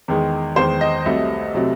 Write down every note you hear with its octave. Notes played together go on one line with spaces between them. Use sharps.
E2 D#3 G#3
E2 D#3 G#3 C5
D#5
C2 C3 F#3 A3
C3 F#3 A3